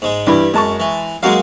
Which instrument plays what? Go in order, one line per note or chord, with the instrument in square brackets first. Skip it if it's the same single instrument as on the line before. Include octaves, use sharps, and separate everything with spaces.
[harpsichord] G#2 G#3
[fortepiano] G2 E3 B5 [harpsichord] G3
[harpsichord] F#2 [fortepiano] G#3 A5 C#6
[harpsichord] E3
[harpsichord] F#3 A#3 G#4 [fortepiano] G#3 F#4 F5